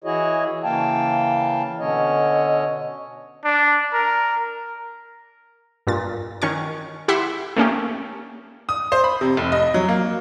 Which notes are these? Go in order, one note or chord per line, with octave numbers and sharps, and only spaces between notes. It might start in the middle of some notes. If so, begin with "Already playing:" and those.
E3 E4 F#4 G#4 C#5 D#5
C#3 E3 A#3 F5 G5 A5
B2 D3 C#4 C#5 D#5
D4
A#4
G2 A#2 A6
D#3 C#4 C#5 C#6
E4 G4 E5 F#5 C6
A3 A#3 C#4 G4
D#6
C5
B5
C3
F1
D#5
F#3
A#3